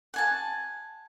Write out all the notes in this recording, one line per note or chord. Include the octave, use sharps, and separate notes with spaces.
F#5 G#5 A5